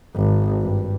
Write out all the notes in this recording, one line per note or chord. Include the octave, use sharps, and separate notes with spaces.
G#1
G2